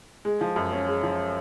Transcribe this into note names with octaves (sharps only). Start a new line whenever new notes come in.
G#3
F3
F#2
C#4
G#3
F3